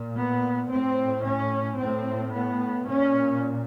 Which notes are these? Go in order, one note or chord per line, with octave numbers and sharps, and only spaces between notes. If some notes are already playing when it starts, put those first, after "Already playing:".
Already playing: A#2
B3
A2 C4
C#4
A2 C4
B3
A#2 C#4